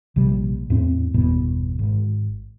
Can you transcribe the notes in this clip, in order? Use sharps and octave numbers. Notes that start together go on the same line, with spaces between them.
A#1 C3 G3
E2 A2 C4
G1 E2 B2
G#1